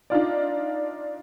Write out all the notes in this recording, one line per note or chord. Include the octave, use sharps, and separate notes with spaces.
D4 D#4 F4 D5